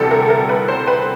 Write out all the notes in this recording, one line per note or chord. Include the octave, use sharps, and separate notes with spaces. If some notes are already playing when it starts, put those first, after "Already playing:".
Already playing: D2 C3 E3 G3 A4
A#4
A4
A#4
B4
C5
B4